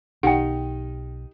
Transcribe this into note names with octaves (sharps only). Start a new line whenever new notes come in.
B1 D#3 D#4 G4 F#5 G5